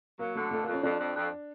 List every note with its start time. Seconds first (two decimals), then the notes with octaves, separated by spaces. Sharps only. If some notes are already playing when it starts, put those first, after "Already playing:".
0.19 F#3 A#3
0.35 D3 A3
0.51 F2 A3
0.63 A#3
0.68 F2
0.74 C#4
0.83 F2 D4
1.00 F2
1.16 F2